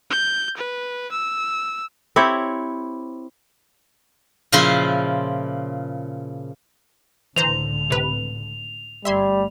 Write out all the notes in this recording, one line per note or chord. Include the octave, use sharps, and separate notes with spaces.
G6
B4
E6
C4 E4 G4 C#5
A#2 C#3 F3 E4 F4 C6
C#2 A2 D3 E3 C5 A#5 F7
C3 B4
G1 G3 A3 E5 C6 G#6